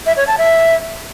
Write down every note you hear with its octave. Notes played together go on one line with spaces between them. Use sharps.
E5
C#5
A5
E5